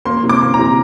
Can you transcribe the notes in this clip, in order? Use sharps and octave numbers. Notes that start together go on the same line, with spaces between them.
A#3 C6
C3
D6
A#3
A#5
C3